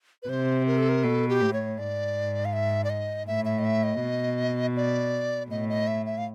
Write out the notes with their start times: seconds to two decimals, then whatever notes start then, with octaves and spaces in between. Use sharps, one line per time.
0.23 B4
0.29 C3 C5
0.67 A#4
0.78 A4
0.89 A#4
1.03 B2 A4
1.29 G4
1.41 A2
1.53 C#5
1.78 G#2 D5
2.45 F5
2.53 E5
2.84 D5
2.90 D#5
3.27 A2 E5
3.45 E5
3.59 D#5
3.65 E5
3.83 D#5
4.01 B2
4.76 D5
5.50 A2 D#5
5.69 D#5
5.87 E5
6.06 E5
6.18 F5